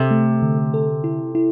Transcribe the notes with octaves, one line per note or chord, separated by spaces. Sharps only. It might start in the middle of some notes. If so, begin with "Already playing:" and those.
Already playing: C3 A4
A3
D3
A4
E4
E4